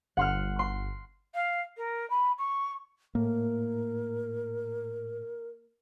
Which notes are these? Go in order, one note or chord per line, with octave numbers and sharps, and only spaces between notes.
G1 F#5 C6 F6
C6
F5
A#4
B5
C#6
A2 A#3 A#4